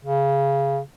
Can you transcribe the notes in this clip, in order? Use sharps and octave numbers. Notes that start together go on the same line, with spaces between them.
C#3